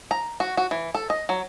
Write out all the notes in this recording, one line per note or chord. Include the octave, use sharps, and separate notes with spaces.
A#5
F#4
F#4
E3
A4
D#5
F#3